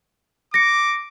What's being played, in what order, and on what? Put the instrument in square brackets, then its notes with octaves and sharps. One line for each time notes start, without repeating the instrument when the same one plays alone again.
[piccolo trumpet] D6 [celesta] A#6 C#7